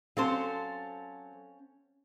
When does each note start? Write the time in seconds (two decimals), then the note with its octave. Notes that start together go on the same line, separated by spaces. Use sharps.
0.17 F#3 C4 C#4 A4 C5 F5